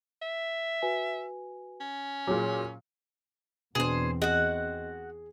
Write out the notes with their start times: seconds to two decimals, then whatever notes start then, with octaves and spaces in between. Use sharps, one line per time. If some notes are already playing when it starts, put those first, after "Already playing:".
0.22 E5
0.82 F#4 B4 G#5
1.81 C#4
2.27 A#2 F#3 G#4 D6
3.75 E2 B2 C4 D4 G#4 C5
4.22 F#4 G#4 D#5 F#5